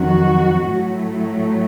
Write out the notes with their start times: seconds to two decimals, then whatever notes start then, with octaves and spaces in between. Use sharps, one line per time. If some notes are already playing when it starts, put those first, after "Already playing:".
Already playing: F2 D#3 F#3 F#4
0.65 A2 F#3 A3